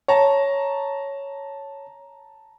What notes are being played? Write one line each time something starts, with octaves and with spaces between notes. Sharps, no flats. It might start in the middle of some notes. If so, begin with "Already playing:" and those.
C#5 A5 A#5